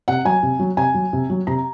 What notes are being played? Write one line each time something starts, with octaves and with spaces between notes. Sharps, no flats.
C3 F#5
F#3 G#5
C3
F#3
C3 G#5
F#3
C3
F#3
C3 A#5